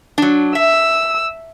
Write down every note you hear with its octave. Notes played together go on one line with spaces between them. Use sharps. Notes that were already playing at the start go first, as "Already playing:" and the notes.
F#3 D4
E5 E6